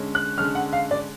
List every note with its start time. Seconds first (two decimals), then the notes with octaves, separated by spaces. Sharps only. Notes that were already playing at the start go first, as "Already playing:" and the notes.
Already playing: D3 G#3 C#4
0.15 F#6
0.38 D3 G#3 C#4 F6
0.55 F#5
0.73 F5
0.91 D5